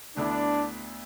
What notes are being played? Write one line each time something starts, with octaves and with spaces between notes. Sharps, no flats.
D2 D3 B3 D4 E4